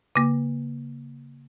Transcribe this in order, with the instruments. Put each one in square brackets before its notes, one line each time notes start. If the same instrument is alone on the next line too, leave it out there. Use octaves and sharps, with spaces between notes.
[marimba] C#3 A#3